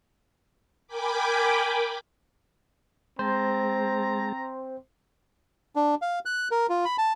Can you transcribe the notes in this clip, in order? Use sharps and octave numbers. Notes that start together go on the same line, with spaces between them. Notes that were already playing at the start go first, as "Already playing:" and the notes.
A#4 G5 G#5 B5 D6
G#3 C4 C5 A5 A#5
D4
F5
F#6
A#4
F4
B5
A5